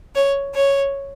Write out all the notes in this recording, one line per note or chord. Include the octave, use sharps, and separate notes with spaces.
C#5
C#5